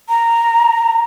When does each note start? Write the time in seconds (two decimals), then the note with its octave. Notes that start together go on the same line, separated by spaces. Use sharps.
0.09 A#5